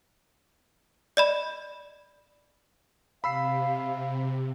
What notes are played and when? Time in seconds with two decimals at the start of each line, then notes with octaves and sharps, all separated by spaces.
1.17 D5 D#5 B5
3.24 C3 F5 B5 E6 C7